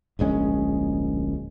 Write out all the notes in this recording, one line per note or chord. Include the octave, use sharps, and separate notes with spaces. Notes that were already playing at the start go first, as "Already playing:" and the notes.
D1 A#1 G#3 C#4